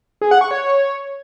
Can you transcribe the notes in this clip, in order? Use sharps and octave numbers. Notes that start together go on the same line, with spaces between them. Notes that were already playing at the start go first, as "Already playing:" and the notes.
G#4
F#5
C#6
C#5